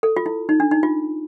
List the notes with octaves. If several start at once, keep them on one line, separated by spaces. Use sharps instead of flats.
A4
F4
E4
D#4
D4
D#4
F4